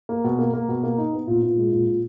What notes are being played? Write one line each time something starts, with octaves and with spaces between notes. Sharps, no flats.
A#3
B2
A#3
A#3
B2
A#3
D#4
B3
A#2
A#2
G#3
A#2
A#2